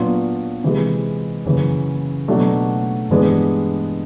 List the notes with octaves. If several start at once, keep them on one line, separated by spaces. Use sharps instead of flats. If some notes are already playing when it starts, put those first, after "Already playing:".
Already playing: A#2 F#3 B3 D4 F4
C3 E3 G#3
F#2 C#3 E3
B2 F#3 A3 D4
G2 E3 G#3 B3 D4